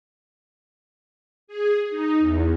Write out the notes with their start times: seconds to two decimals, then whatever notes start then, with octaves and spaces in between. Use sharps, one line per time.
1.47 G#4
1.90 D#4
2.19 E2